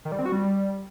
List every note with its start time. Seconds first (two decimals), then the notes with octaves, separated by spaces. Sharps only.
0.05 D#3
0.12 G3
0.19 C4
0.25 F#4
0.32 G3